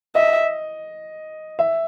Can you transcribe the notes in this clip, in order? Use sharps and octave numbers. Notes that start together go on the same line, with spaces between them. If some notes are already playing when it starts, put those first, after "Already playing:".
D#5 E5
E5